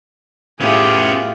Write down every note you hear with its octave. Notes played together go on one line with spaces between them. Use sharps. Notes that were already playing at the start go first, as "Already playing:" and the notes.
A2 B3 C#4 F4 G4 G#4